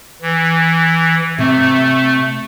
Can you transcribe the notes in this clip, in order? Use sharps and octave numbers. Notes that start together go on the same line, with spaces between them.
E3
C3 A3